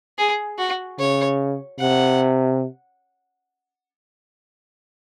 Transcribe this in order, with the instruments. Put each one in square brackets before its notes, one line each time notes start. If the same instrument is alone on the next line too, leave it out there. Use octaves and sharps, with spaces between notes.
[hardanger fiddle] G#4
F#4
[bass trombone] C#3 [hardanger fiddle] C#5
[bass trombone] C3 [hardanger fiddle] F#5